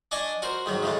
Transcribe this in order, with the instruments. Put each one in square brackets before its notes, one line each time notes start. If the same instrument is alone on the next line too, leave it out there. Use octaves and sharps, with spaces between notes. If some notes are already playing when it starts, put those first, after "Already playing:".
[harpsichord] D4 D#5 G#5 C#6 D#6
F#4 A#4 C5
G#2 D#3 F#3
C#3 E3 G#3 A3